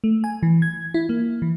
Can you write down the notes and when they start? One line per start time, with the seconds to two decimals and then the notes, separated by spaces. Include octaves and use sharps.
0.04 A3
0.24 G#5
0.43 E3
0.62 G#6
0.94 E4
1.09 A#3
1.42 E3